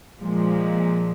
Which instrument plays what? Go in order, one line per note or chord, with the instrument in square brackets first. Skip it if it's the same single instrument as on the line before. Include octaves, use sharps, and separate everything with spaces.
[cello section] A#2 F3 G#3